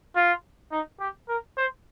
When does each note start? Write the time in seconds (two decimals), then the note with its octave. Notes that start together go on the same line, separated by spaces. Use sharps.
0.16 F4
0.72 D#4
1.00 G4
1.28 A#4
1.57 C5